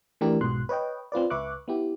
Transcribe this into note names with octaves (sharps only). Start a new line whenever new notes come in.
E3 A3 D4 G4 A#4
B1 G#2 B2 C6 F#6
B4 C#5 D#5 G5
C4 F4 B4 D5
C#2 B4 E5 C#6 D6 F#6
B3 E4 G4